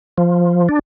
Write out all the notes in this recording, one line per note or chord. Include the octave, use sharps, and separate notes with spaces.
F3
D4